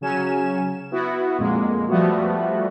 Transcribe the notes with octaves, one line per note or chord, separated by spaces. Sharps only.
C#3 F#3 C#4 G#5 E7
B3 E4 F#4
F2 A#2 G#3 A#3
F3 G3 A3 B3 F#4